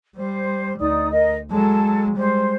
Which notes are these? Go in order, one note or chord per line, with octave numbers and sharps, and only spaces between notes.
G3 C5
D2 D#4 D5 D#6
A#4 D#5
F#3 G#3 A4 A5
G3 G#3 C5